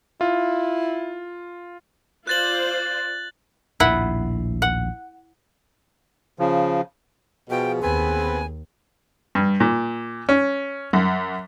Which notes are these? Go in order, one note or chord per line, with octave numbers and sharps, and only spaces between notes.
E4 F4
F4 C5 D5 F#6 A6 F#7
A#1 D#2 A2 E4 F#5
F#5
C#3 F3
B2 F3 G#4 G5
D#2 B3 C4 B4 G#5
G2
A#2
C#4
F#2